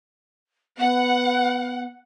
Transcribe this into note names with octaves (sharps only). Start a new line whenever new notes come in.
B3 F#5